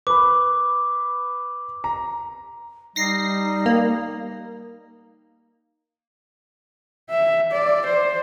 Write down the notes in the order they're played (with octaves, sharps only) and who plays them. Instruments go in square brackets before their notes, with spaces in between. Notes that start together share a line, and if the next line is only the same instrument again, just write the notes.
[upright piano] B4 B5 [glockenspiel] D6
[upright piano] A#5
[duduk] G3 [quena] D#4 [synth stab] A#6 C7
[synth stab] A#3
[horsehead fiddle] E5
D5
C5